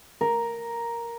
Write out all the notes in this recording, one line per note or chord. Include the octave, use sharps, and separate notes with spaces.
A#4